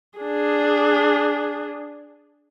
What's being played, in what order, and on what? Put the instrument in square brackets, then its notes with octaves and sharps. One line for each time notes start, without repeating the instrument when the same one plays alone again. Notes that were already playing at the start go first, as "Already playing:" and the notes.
[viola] D4 G#4